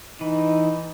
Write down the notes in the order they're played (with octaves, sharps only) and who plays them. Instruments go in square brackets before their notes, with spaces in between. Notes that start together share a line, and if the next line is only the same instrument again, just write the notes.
[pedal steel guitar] E3 [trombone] D#4